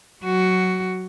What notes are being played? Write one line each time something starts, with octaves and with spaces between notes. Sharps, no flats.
F#3 F#4